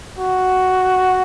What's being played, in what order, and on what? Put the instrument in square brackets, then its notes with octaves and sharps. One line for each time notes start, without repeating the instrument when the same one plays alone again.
[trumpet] F#4